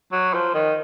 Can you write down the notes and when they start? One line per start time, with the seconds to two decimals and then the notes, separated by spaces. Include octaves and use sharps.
0.12 F#3
0.34 F3
0.54 D#3